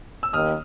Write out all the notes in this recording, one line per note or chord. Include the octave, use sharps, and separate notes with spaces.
E6
D#2 D#3 D#6 F6